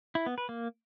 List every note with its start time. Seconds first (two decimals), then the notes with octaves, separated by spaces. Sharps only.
0.15 E4
0.26 B3
0.38 B4
0.49 A#3